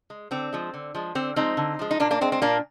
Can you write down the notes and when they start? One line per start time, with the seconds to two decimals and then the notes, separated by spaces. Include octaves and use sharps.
0.10 G#3
0.31 D3 C4
0.53 F3 G#3
0.74 D3
0.95 F3 G#3
1.15 D3 C4
1.36 F3 G#3 C4 D#4
1.57 D3
1.79 F3 G#3
1.91 D#4
2.00 A#2 A#3 D4
2.11 A#3 D4
2.21 G#3 C4
2.32 C4
2.42 A#2 A#3 D4